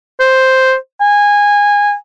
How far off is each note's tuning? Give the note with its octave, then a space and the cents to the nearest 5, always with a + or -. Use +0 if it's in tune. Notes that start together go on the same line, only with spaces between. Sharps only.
C5 +0
G#5 -20